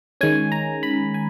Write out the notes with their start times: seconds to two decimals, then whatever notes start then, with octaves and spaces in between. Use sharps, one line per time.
0.21 D#3 G#3 C#4 G#5
0.52 A#5
0.83 B5
1.14 G#5